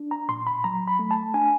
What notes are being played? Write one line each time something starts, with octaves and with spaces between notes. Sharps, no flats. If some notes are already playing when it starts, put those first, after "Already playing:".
Already playing: D4
A#5
A#2 C6
B5
F#3 A#5
B5
A3
A5
D4 G#5